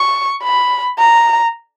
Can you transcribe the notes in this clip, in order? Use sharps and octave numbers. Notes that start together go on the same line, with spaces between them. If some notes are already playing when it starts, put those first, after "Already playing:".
Already playing: C#6
B5
A#5